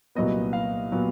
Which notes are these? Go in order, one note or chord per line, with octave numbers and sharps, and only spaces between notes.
C2 A#2 F#3 B3 D#5
F5
A#2 F#3 B3